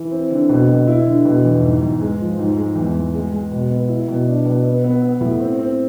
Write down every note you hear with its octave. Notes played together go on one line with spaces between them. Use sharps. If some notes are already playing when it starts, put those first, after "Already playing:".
Already playing: E3
C4
D3
B2
B2
E4
D3
B2
E2
G#2
G#2
G#3
F3
G#2
G#3
E2
G#3
G#3
G#3
B2
B3
E4
B2
D4
B2
B3
B3
B3
A2
C4
C4